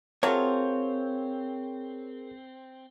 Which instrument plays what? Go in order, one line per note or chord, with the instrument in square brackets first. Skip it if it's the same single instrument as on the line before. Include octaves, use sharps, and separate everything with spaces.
[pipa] F#3 A3 F4 [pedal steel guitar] C4 [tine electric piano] G#4 A#4 [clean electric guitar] C#5